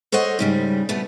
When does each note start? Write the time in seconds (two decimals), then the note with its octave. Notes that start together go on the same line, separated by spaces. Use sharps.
0.12 A4 C5 C#5 D#5 F#5
0.39 G#2 C#3 G3
0.89 B2 A3 B3